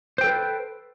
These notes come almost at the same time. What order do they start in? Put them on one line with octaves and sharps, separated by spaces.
C5 G5 A4 B4